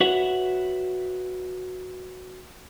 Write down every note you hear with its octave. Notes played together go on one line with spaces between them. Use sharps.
F#4 B4 C#5 E5 F#5